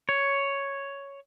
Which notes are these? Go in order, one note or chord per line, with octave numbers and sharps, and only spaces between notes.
C#5